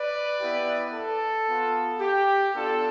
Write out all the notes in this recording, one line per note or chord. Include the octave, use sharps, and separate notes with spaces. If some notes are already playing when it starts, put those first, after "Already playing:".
Already playing: B4 D5
B3 E4 G4
A4
B3 F4
G4
B3 D4 F4 A4